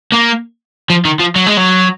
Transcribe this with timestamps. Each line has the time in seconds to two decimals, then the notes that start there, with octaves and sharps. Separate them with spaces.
0.13 A#3
0.90 F3
1.05 D#3
1.19 F3
1.36 F#3
1.46 G#3
1.57 F#3